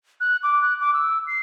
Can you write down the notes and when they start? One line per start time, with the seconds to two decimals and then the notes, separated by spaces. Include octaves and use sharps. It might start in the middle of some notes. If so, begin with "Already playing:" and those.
0.20 F#6
0.43 D6
0.61 F#6
0.80 D6
0.94 E6
1.27 C7